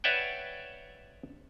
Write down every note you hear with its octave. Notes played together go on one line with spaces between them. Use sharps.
B4 C#5 D5 E5 F#5 G5